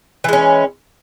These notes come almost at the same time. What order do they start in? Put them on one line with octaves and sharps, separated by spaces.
E3 G#3 C#4